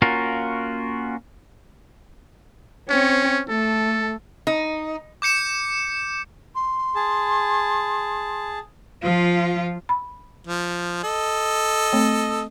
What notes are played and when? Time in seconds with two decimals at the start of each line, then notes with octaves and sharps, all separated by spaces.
0.02 A#3 C#4 F4 F#4 A#4
2.89 C4 C#4 C#5
3.49 A3 A4
4.47 D#4
5.22 D6 G6 C#7 E7
6.55 C6
6.95 G#4 A5
9.03 F3 F4
9.89 B5
10.47 F3
11.03 A4 D#5
11.92 A3 C4 C#5